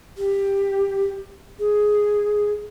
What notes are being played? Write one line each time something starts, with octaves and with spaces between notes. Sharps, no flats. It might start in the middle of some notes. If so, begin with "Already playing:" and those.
G4
G#4